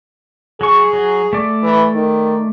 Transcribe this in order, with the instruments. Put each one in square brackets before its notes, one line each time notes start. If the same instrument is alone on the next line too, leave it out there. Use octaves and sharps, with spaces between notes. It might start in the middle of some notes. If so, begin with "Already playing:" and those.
[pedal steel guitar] F#3 C#6 [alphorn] G#4
[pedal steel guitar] F#3
A3 D5
[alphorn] E3
D#3